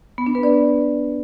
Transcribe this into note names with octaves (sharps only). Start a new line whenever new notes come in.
B3
D4
B4
D5